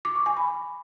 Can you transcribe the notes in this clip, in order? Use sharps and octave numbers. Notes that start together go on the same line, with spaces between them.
D6
C#6
G#5
B5